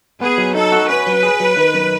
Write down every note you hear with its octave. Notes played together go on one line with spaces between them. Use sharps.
B3 G#4
F#3
D#4 A4
F#4
C#4 B4
F#3
G#4
F#3
D#3
F#2